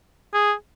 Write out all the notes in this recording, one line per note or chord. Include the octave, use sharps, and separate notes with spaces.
G#4